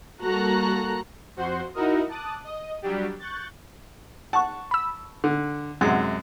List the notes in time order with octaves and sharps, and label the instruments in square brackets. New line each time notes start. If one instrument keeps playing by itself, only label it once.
[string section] G3 A#3 F#4 A4 A#5 F#6
[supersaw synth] F2 F#4 C5 F#5 C6
D#4 E4 F#4 A#4 D#5
A5 D6 D#6 F#6
D#5
F#3 G3 D4 G4
C#6 F#6 G6 A6
[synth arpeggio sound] F#5 [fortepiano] A5 C#6
[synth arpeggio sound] B5 E6
[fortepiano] D3
[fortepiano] F#2 C3 G#3 [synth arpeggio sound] F#5